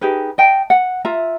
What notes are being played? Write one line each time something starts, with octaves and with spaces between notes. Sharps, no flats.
D#4 G4 G#4 B4
D#5 G5 A5
F#5
F4 E5 A#5